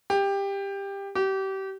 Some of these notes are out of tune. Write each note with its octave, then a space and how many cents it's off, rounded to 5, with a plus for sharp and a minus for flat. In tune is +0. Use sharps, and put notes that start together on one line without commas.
G4 +15
G4 -30